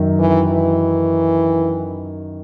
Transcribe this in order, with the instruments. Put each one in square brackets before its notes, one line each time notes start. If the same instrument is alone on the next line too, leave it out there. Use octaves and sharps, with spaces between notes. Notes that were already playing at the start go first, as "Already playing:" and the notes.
Already playing: [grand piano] F#2 D#3 F#3
[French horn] E3
E3